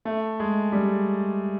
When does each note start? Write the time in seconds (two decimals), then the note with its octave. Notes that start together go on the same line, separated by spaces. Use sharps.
0.05 A3
0.40 G#3
0.72 G3